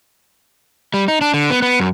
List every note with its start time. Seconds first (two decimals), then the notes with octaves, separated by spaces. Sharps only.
0.94 G3
1.08 D#4
1.21 D4
1.34 D3
1.50 B3
1.62 B3
1.80 F#2